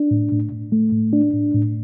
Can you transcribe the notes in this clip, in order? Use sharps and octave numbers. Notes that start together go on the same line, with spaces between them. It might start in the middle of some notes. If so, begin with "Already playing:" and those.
Already playing: D4
A2
A2
A2
A3
A2
D4
A2
A2